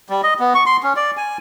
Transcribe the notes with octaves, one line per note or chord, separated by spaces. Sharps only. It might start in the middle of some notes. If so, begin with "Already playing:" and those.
G3
D#5
B3
C#6
C6
C#4
D5
G#5